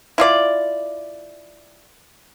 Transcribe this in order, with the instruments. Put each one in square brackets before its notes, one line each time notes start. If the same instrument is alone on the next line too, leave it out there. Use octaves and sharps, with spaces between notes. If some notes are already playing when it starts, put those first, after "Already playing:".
[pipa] E4 F4 D5